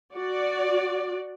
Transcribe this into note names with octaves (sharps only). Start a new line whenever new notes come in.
F#4 D5